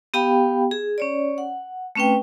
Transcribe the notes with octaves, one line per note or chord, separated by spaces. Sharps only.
B3 G4 F5 G5 B5
G#4
C#4 C#5 D5
F#5
A3 C4 C#4 B4 G5